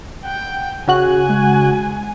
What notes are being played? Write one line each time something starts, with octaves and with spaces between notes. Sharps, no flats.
F#5 G5
C#3 F#4 G#4 G#5 F#6
G#3